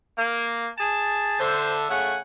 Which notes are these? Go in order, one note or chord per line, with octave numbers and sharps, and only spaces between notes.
A#3
G#4 A5
D3 A4 C5 E5
C#3 A3 F#5 G#5